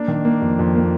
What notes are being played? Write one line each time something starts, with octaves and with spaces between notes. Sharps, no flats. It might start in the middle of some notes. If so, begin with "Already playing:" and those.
Already playing: A#3 D4
D#3
A#3
F2
F2
A#3